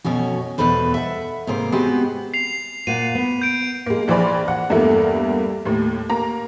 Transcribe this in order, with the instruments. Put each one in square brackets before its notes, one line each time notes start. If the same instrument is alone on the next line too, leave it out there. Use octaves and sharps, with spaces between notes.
[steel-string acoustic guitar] F2 B2 C#4 F#4
E2 B2 A4 B4 C5
E5 F#5
G#2 C3 A#3 C5
G#3 B3 C4 F#4 G4 G#5
[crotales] C7 F7
[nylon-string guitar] A#2 F5 F#5 [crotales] D#7
[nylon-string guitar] B3
[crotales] G6 D7
[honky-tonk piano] G#3 A#3
A#1 E3 C5 D5 B5
F#5
E2 G2 G3 A3 A#3 E4
D#2 A2
A#3 A#5